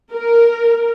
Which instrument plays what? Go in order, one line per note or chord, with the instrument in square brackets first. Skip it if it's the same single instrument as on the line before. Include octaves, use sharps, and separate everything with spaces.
[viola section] A#4